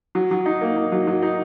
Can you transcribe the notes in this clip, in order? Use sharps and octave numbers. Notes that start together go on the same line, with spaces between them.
F#3
F#3
D#4
A#3
D#4
F#3
F#3
D#4